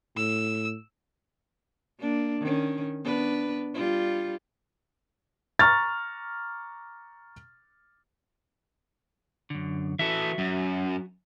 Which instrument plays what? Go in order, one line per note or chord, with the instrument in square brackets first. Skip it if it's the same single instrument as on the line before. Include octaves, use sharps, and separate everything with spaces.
[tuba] A2 [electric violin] E6
[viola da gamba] A#3 D4
D#3 C#4
B3 D4 B4
G3 F4
[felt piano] A#5 C#6 F6 A6
[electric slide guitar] F#2 D3
[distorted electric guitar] E3 A4 [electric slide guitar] F#4 E5
[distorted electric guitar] F#2